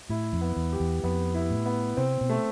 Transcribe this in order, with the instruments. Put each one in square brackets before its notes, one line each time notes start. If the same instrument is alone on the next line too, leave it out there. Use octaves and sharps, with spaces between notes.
[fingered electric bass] A2 [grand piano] E4
[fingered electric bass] F2
[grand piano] B3
[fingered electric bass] E2
[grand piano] G4
[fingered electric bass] E2
[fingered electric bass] F2 [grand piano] B3
[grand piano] E4
[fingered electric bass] A2
[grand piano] B3
[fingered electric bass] C3 [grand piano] C4
[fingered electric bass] B2
[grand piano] A3